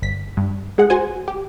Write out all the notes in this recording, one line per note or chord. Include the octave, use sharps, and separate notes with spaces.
G1 B6
G2
G#3 G#4 F#5
F#4 C5 G#5
G4